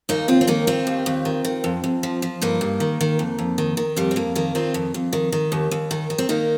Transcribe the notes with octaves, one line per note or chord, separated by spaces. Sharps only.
D#2 A#3 D#4
D#2 C4 F4
C4
D#3 A#3 D#4
D#3 C4 F4
D#2
D#2
D#3
D#3
F2
F2
F3
F3
G2 A#3 D#4
G2
D#3
D#3
F2
F2
D#3
D#3
F2 G3
C4
F2 A#3
D#3 A#3
D#3 C4 F4
F2
F2
D#3
D#3
D#2
D#2
D#3
D#3
C4
D#3 A#3 D#4